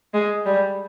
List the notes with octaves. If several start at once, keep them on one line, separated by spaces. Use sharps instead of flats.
G#3
G3